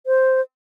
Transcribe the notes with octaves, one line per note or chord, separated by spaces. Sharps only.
C5